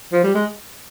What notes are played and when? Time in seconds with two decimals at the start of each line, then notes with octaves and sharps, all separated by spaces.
0.13 F3
0.24 G3
0.34 G#3